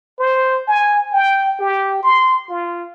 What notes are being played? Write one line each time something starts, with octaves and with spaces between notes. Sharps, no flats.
C5
G#5
G5
G4
C6
F4